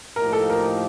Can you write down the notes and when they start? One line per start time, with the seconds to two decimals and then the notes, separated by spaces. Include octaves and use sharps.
0.16 A2 F3 A#3 D#4 G4 A#4
0.33 A4
0.50 A#4